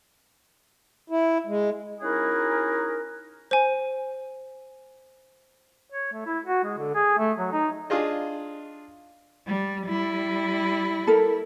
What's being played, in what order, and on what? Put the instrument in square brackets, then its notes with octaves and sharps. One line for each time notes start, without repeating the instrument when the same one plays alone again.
[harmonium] E4
G#3
[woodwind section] C#4 D#4 E4 F#4 G#4 A#4
[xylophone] C5 G#5
[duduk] C#5
A3
E4
F#4
G#3
D3
G#4
A3
F#3
D#4
[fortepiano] D4 F4 G#4 D#5
[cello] G3
G3 E4
[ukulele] A4 A#4